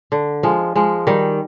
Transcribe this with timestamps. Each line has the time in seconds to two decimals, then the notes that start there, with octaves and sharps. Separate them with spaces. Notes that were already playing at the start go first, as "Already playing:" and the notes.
0.12 D3
0.43 F3 G#3
0.76 F3 G#3
1.07 D#3 G3